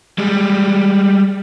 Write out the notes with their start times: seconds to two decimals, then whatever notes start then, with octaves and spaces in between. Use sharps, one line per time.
0.18 G3 G#3